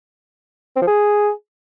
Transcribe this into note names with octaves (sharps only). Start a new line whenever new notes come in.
C4
F3
G#4